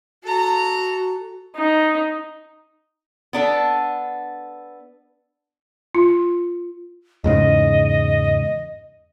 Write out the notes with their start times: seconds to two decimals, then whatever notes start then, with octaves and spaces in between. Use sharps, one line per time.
0.24 F#4 A4 A#5
1.56 D#4
3.33 B3 D4 A4
5.95 F4
7.24 E2 G#2 C#3 D#5